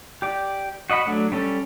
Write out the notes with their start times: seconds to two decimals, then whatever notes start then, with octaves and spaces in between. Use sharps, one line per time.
0.22 G4 D5
0.90 F#4 D#5 F#5 B5
1.06 F#3 A3 D4
1.32 G3 C#4 A4